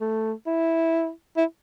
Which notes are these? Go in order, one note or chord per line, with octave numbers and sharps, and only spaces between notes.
A3
E4
E4